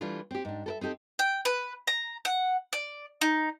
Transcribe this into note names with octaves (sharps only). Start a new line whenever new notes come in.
E3 G3 A3 D4 F4
C4 G4
G#2 D4
A4 A#4 E5
C4 D#4 G4 A4
G5
B4
A#5
F#5
D5
D#4